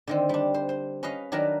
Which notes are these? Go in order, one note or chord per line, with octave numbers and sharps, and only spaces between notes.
D3 D#3 C4
G3 D4
C5
C5
C#4 B4 D#5 F5
D#3 F#3 D4 A#4 B4